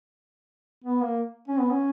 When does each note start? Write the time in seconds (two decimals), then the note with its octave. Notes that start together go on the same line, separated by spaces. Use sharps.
0.84 B3
1.02 A#3
1.48 C#4
1.59 B3
1.71 C#4